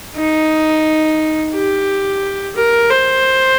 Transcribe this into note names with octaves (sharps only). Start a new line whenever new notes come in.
D#4
G4
A#4
C5